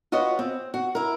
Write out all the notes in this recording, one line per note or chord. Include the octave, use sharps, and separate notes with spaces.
F4 F#4 B4 C#5 D#5
C4
F#4
E4 A#4